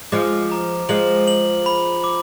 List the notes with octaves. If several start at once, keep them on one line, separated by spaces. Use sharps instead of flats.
F3 G#3 D6
A#5
F3 G#3 F#7
F#7
B5
D6